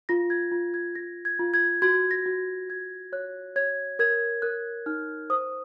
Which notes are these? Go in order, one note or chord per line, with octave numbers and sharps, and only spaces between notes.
F4 A#6
G#6
F4
G#6
F4 A#6
G#6
F4
G#6
F#4 G#6
A#6
F#4
F#4 G#6
C#5 F#6
C#5 G#6
A#4 G#6
A#4 F#6
D#4 F6
C5 D#6